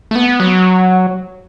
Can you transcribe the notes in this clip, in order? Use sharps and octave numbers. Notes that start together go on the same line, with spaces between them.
A3
B3
F#3